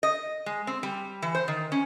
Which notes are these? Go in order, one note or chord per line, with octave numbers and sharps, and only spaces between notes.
D#5
G#3
C4
G3
E3
C5
D#3
C#4